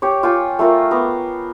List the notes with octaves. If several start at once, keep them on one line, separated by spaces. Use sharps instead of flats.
G4 C#5
F4 G5 G#5
A3 F4 A#4
B3 A#5 D6